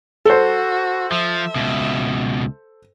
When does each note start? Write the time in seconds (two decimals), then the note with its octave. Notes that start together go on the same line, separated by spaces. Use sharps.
0.25 F#4 A4 C5
1.12 F3 E5
1.56 C#2 B2